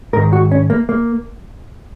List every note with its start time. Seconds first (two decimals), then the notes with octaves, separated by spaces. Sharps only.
0.13 G#2 A#4
0.17 D#3
0.33 F#4
0.51 C#4
0.70 A#3
0.89 A#3